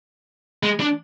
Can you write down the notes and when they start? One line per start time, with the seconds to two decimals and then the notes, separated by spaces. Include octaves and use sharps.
0.63 G#3
0.80 D4